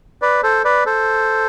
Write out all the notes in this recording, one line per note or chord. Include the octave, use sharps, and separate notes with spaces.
B4 D5
A4 C5
B4 D5
A4 C5